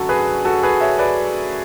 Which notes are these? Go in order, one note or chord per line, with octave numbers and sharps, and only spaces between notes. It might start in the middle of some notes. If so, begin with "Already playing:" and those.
Already playing: F#2 D3 A3 F#4 A4
G#4 B4
F#4 A4
G#4 B4
C#5 E5
B4 D5